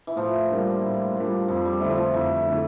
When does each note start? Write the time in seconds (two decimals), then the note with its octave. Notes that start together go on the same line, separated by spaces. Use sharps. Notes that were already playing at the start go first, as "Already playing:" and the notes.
0.07 E3
0.16 A2 F3
0.49 G3 A#3 D4 F4
0.83 A2
1.15 G3 A#3 D4 F4
1.48 F2 F3
1.65 G3
1.81 D3 F3 A3 E4
1.90 E3
1.97 F3
2.14 F2 E3
2.47 D3 A3 E4